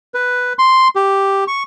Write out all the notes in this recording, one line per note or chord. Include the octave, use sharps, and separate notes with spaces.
B4
C6
G4
C#6